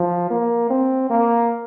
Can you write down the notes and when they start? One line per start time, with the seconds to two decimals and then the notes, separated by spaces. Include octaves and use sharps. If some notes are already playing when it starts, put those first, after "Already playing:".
Already playing: F3
0.30 A#3
0.70 C4
1.10 A#3